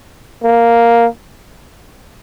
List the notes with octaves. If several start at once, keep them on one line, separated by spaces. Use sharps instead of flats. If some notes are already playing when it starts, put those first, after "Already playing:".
A#3